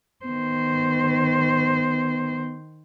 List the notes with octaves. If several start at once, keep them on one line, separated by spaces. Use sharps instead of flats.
D#3 B3 C5